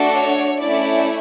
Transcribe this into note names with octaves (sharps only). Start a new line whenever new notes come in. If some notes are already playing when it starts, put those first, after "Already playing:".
Already playing: A3 D4 F#4 A4
C#5
A3 C#4 E4 D5